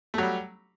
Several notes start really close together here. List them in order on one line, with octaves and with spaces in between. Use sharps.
A3 F#3 G3